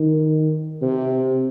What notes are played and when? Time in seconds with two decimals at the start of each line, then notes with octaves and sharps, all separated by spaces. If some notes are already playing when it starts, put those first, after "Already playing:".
Already playing: D#3
0.82 C3